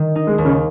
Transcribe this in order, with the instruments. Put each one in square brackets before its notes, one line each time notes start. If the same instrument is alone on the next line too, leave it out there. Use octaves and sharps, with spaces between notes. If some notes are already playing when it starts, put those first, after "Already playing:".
Already playing: [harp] D#3
D#4
[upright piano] G#3
[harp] D#2
[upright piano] C#3